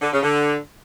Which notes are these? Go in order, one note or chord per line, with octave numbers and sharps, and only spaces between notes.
D3
C#3
D3